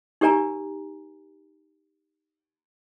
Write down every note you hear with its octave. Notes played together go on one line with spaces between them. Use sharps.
D#4 G4 A#4 D5 G#5 A#5